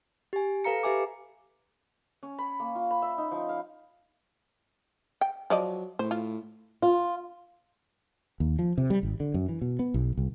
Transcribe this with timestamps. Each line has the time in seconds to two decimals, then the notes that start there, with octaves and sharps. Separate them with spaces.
0.33 G4 G#5
0.64 A4 B4 F5 A#5 C#7
0.83 G4 B4 E5 G#5 D6
2.23 C#4
2.38 B5
2.60 A#3
2.75 F4
2.91 B5
3.02 E5
3.18 D#4
3.31 F3
3.49 F5
5.21 G5
5.50 F3 F#3 D5 D#5
5.99 A2 C5
6.11 F4
6.82 F4
8.40 D#2
8.59 F3
8.78 C3
8.90 G3
9.03 G#1
9.20 D3
9.34 F#2
9.49 E3
9.62 B2
9.79 B3
9.94 B1
10.17 C2